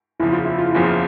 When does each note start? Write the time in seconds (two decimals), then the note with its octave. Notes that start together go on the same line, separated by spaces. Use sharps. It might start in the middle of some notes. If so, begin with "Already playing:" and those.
0.20 F#1 E2 C#3 F3 E4
0.32 F4
0.45 E4
0.58 F4
0.71 F#1 E2 C#3 F3 E4
0.84 F4